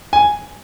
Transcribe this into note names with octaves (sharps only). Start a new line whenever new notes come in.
G#5